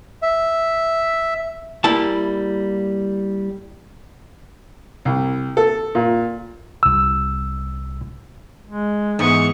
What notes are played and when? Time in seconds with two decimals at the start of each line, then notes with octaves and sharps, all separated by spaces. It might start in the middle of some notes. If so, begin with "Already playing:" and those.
0.22 E5
1.84 G3 A#3 E4 A5
5.05 C2
5.57 A4
5.95 A#2
6.83 C2 E6
8.67 G#3
9.19 G#2 E3 B3 C#6 D#6